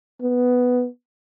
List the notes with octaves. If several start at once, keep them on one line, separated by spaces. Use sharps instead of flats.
B3